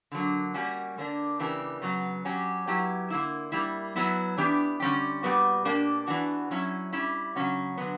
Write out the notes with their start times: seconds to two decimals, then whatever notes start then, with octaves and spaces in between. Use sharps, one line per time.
0.12 D3 F#3 A#3
0.54 G3 A#3 C#4 F#4
0.98 D3 A#3 D4
1.39 C#3 E3 A#3 D4 G4
1.82 C#3 F#3 B3
2.25 F#3 C#4 G4
2.67 F#3 B3 E4 G4
3.10 D3 A#3 E4
3.52 G3 A#3 E4
3.96 F#3 B3 E4
4.38 E3 B3 D4 G4
4.80 D3 G3 C#4 G4
5.23 A#2 G3 B3 F#4
5.65 B2 A#3 D4 G4
6.08 E3 B3 D4 F#4
6.51 F#3 C#4 E4
6.93 G3 C#4 E4
7.36 C#3 F#3 C#4 F#4
7.78 D3 F#3 B3